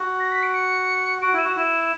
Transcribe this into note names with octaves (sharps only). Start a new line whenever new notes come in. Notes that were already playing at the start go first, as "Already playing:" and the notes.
Already playing: F#4
A#6
B6
D7
C#7
F#4 D7
E4
E7
F#4
E4 E7